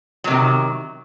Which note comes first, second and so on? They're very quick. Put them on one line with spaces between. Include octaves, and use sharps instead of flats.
F#3 C3 D#3